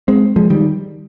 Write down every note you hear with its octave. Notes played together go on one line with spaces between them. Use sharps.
G#3 C4
F3 G#3
D#3 G3